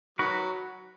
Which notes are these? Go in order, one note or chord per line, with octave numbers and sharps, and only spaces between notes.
D#3 F#3 F#4 B4